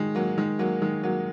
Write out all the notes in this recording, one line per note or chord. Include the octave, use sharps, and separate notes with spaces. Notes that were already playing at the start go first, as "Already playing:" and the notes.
Already playing: D#3 G#3
F#3 A#3
D#3 G#3
F#3 A#3
D#3 G#3
F#3 A#3